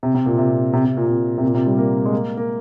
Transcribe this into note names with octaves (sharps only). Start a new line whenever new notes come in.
C3
C3
A#2
C3
C3
C3
A#2
C3
C3
A#2
C3
G3
A#3
G#3
A#3
A#3